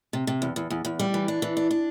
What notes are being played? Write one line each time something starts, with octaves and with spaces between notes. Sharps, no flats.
C3
C3
E2
E2
E2
E2
G3
E3
D4
E3
D4
D4